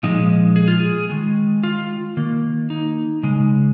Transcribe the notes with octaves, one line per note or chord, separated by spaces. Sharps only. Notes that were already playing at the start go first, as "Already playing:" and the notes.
A#2 F3 G#3 D#4
G#4
F4
G#4
D#3 G#3
F4
D#3 A#3
D#4
C#3 G#3